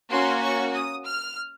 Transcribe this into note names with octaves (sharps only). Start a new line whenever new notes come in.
A#3 C#4 F#4 C6
C#6
D#6
F6